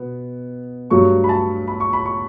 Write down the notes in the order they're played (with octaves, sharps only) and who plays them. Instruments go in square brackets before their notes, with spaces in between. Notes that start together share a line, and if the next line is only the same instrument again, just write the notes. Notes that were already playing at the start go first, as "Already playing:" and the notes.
Already playing: [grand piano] B2 B3
G2 F#3 A3 C#6
B5
A5
B5
C#6
B5
C#6